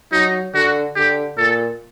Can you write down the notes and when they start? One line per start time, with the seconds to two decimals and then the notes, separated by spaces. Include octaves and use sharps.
0.12 F#3 D#4
0.54 D3 F#4
0.96 D3 G4
1.38 A#2 A4